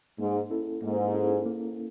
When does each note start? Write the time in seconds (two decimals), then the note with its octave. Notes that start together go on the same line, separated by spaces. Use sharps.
0.19 G#2 A#3
0.50 C#4 E4 A4
0.82 G#2 A#3
1.14 C#4 E4 A4
1.46 A#3